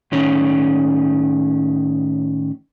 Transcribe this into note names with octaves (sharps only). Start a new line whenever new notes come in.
A2 D#3 C#4